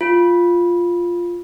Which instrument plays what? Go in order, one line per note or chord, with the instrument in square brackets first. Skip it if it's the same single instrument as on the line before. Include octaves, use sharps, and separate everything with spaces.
[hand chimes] F4